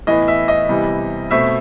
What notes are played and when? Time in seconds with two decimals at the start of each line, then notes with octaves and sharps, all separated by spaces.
0.07 A2 E3 B3 D#5
0.28 E5
0.48 D#5
0.69 C3 E3 G3 B3
1.31 B2 A3 C4 E5